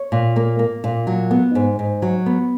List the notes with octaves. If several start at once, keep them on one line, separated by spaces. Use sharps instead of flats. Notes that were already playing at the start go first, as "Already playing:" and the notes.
Already playing: C#5
A#2
A#3
A#3
A#2
F#3
B3
G#2
G#2
F#3
B3